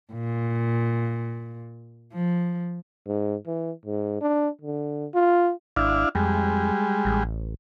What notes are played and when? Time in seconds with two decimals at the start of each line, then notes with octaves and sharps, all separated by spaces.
0.13 A#2
2.13 F3
3.07 G#2
3.46 E3
3.85 G#2
4.21 D4
4.61 D3
5.14 F4
5.76 G#1 D4 E4 F5
6.15 F2 G3 G#3
7.05 A1